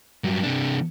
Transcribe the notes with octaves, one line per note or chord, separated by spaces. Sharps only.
G2 F#3
C3 D4